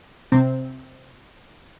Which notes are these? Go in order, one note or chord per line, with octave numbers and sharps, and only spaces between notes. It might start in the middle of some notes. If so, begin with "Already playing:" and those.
C3 C4